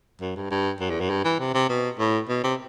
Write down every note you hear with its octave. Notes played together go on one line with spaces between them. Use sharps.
F#2
G2
G2
F#2
E2
F#2
G2
E3
C3
C3
B2
A2
B2
C3